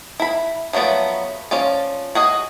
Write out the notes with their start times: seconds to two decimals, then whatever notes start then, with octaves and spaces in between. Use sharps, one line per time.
0.20 E4 B5
0.73 F3 F#3 A3 B3 D5
1.51 F3 C#4 F4 D5
2.15 F#4 G#4 D#5